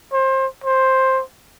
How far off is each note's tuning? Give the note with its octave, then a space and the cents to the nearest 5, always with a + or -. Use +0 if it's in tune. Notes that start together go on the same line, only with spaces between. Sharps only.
C5 +25
C5 +10